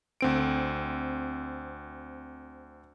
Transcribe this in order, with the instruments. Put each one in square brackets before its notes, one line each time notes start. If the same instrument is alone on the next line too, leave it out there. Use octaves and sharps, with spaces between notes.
[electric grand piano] D2 C4 D7